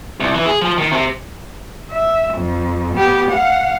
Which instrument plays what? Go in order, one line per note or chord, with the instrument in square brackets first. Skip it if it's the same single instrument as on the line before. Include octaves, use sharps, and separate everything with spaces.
[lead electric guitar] C2
E3
G#4
F3
D#3
C3
[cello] E5
F2
B3 G4
F5 F#5